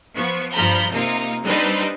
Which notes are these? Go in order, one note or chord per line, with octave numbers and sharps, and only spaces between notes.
F3 B3 C#6
G2 F3 A#5 B5 G6
C3 A#3 D#4 F4
G3 C4 D4 D#4 B4 C5